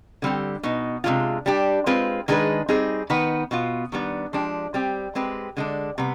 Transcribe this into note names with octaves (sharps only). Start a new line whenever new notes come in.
D3 G3 C4 G4
B2 B3 D#4
C3 D#3 G#3 D4 F4
G3 D4 G4
G#3 C4 F4 B4
D#3 G#3 D4 G#4 B4
G3 C4 D#4 G#4
D#3 B3 D#4 B4
B2 B3 F4
D#3 G3 B3 D4
F3 G#3 D4 G4
G3 C4 G4
G#3 C4 G4 B4
D3 G#3 D4
C3 G3 B3